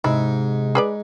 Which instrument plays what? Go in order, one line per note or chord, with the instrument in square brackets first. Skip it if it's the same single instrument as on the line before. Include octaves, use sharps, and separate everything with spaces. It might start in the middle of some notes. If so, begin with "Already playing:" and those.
[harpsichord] G#2 [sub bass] C3 [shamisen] E4
[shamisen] G#4 B4 D5